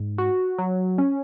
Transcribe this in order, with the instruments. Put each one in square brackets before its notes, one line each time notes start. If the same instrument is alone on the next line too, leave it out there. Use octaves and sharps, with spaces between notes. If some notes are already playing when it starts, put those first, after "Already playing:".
Already playing: [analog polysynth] G#2
F#4
F#3
C#4